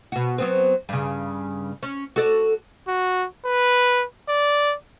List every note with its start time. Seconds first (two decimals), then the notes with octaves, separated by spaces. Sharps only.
0.12 B2 F#4
0.38 F#3 B3 C4
0.89 G2 C#3
1.83 C#4
2.16 F#4 A4 D5
2.88 F#4
3.45 B4
4.29 D5